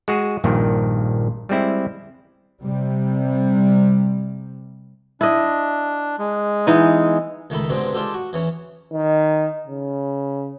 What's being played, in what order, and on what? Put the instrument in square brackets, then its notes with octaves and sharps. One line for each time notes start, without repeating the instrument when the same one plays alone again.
[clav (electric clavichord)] G#3 F#4 G#4
A#1 G2 A#2 D#3
G3 G#3 C4 E4
[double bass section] C3 G3
[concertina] D4 [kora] E4 D#5
[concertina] G#3
[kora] E3 B3 D#4
[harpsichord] C#2 D#3 A3 D#4 A4 B5
G2 B2 D3 G#3 C4
G3 G#3 D4 F4 G4 A4
F#4
E2 E3 C#4
[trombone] D#3
C#3